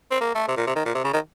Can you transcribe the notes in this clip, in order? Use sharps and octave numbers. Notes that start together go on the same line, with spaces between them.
C4
A#3
A3
C3
A#2
C3
D#3
A#2
C3
C#3
D#3